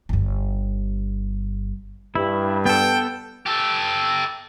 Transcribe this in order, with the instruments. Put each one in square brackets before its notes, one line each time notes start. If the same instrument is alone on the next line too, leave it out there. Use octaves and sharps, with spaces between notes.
[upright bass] G1 G2
[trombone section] G2 [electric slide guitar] E4
[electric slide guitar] B3 A4 [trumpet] G5
[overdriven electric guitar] G4 A4